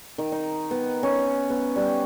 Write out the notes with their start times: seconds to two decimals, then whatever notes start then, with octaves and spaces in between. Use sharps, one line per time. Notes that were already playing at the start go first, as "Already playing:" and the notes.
0.18 D#3
0.32 D#4
0.71 B3
1.03 C#4
1.50 B3
1.76 G3